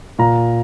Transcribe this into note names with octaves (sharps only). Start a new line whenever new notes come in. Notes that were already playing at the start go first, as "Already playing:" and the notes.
A#2 A#5